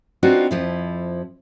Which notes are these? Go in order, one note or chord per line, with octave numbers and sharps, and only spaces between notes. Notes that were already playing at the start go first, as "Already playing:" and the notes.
B3 C4 D4 D#4 F4 F#4
F2 F3 E4